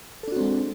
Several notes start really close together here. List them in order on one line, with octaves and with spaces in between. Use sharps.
A4 D4 F#4 C4 G#3